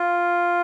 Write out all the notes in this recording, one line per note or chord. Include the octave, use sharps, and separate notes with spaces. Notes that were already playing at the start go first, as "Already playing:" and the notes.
Already playing: F4